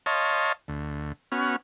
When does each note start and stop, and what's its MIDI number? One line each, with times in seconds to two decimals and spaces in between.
0.06 0.52 73
0.06 0.52 75
0.06 0.52 77
0.06 0.52 81
0.06 0.52 84
0.68 1.13 38
1.32 1.56 59
1.32 1.56 61
1.32 1.56 66
1.32 1.56 89